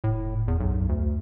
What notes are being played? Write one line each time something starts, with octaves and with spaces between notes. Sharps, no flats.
F1 A2
E2
B1 F#2
D2